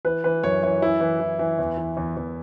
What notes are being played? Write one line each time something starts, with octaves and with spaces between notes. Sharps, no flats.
E3 B4
E3 B4
F#2 C#5
E3 C#5
E3 E4
E3
E3
E3
E2
E3
E2
E2